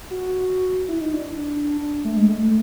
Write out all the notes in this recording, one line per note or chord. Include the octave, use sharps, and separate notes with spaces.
F#4
E4
D#4
D4
A3
G#3
A3
A3